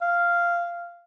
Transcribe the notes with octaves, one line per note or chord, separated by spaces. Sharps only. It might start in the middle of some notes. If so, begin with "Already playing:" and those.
F5